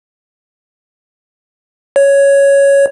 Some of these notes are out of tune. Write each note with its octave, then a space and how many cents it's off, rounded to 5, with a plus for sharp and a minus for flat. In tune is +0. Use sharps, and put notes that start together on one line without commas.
C#5 +5